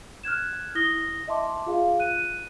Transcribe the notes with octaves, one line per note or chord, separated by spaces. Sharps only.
F6 F#6 G#6 E7
E4 D#6 A#6 G7
D#5 E5 A5 C6 D6
F4 G#4 F5
F#6 D#7